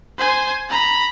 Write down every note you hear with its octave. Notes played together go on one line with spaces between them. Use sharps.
C5 G#5
A#5 B5